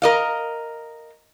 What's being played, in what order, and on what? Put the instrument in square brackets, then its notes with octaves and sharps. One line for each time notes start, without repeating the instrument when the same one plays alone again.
[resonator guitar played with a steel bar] A#4 D#5 F5